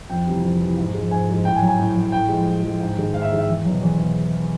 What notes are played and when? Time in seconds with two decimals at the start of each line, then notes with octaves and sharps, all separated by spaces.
0.10 F2 G5
0.26 C3 E3 G3
0.43 F2
0.59 C3 E3 G3
0.77 G#2
0.94 F3 G#3
1.11 G#2 G#5
1.27 F3 G#3
1.44 A2 G5
1.56 G#5
1.61 F#3
1.68 G#5
1.79 A2
1.96 F#3
2.12 A2 G5
2.29 F3 G#3
2.46 A2
2.63 F3 G#3
2.80 G#2
2.97 D#3 G#3
3.13 G#2 F5
3.22 E5
3.30 D#3 G#3
3.38 E5
3.48 E2
3.64 B2 F#3
3.81 E2
3.99 B2